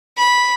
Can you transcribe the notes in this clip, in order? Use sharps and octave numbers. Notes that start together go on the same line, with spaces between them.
B5